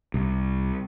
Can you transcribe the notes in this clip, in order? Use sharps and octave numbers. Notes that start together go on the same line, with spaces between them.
C2